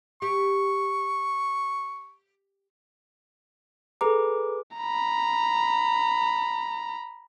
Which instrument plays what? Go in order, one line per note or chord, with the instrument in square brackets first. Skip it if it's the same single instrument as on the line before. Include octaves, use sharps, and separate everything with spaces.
[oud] G4 [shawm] C#6
[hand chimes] G#4 B4 D6 [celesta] A4 A#5
[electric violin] A#5 B5